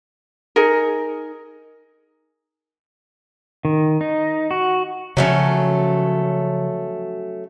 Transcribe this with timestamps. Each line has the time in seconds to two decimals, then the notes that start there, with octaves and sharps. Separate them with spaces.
0.56 D#4 G#4 A#4
3.65 D#3
4.01 D#4
4.51 F#4
5.17 C#3 F3 F#3 A3 C#4